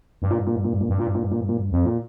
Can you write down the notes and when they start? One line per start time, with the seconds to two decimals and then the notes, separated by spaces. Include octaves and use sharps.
0.22 G2
0.30 A#2
0.38 G2
0.47 A#2
0.56 G2
0.64 A#2
0.73 G2
0.81 A#2
0.89 G2
0.98 A#2
1.07 G2
1.15 A#2
1.23 G2
1.31 A#2
1.41 G2
1.48 A#2
1.57 G2
1.72 F2
1.86 A#2